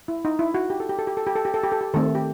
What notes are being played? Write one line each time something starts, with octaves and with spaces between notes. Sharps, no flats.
E4
D#4
E4
F#4
G4
A4
G4
A4
G4
A4
G4
A4
G4
A4
G4
A4
G4
D#3 A3 C4 A4
G4